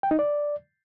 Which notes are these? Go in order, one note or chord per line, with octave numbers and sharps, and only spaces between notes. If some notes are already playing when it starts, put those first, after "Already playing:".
G5
D#4
D5